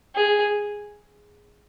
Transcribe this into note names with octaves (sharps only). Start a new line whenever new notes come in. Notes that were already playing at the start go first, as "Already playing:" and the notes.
G#4